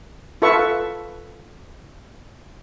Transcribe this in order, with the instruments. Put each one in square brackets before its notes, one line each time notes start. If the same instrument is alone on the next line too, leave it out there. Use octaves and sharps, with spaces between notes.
[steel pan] F4 A4 B4 E5 C#6